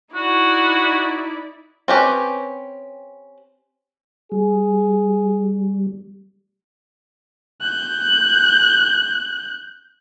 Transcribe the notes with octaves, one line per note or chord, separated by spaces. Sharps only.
D#4 E4 F#4 D5
C4 C#4 G4 B4
G3 G#4
F#6 G6